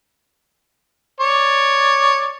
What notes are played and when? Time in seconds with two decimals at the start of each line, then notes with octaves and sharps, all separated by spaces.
1.21 C#5 D5